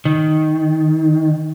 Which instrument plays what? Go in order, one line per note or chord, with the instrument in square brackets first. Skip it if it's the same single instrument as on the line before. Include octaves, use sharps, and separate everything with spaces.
[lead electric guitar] D#3